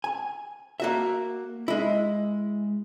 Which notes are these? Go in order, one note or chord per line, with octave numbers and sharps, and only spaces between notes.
G#5
A#3 F#4 E5
G#3 E4